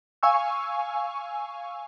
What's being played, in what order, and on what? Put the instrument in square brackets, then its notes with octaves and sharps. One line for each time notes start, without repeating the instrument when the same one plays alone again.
[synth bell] F5 G#5 C#6 E6